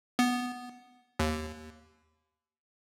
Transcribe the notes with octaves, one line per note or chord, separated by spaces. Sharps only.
B3
D#2